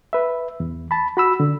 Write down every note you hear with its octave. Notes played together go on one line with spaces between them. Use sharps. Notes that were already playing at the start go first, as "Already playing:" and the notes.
B4 E5
E2
A5 B5
F#4 B5 E6
D3